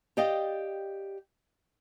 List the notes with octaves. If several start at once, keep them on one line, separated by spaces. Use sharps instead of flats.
G4 D5 D#5 F5 G5